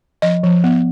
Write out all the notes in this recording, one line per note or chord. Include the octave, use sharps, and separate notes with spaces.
F3 D#5
F3
B3